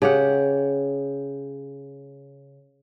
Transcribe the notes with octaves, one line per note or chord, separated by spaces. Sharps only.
C#3 G4 F#5